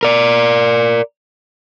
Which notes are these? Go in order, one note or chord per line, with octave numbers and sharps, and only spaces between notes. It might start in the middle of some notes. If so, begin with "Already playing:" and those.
A#4 D5